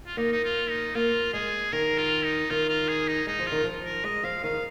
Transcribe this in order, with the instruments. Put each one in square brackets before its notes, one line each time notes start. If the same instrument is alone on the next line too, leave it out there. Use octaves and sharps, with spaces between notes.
[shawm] F4
[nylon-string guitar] A#3 [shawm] D#4
[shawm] D#4
F4
D#4
[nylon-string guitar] A#3 [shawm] F4
[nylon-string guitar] G#3 [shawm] G#4
[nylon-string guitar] D#3 [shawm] A#4
[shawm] F4
D#4
[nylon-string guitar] D#3 [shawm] F4
[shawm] F4
G#4
D#4
[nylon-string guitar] G#3 [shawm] D#4
[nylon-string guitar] F3
[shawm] F4
[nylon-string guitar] D#3
F3
[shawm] A#4
[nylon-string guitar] G#3 [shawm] D#5
[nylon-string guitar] F3 [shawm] F5
[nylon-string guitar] D#3 [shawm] F5